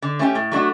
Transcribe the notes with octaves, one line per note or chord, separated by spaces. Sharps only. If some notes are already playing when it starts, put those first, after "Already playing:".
D3
A3 C#4 E4 G4
A2
F#3 A3 D4 F#4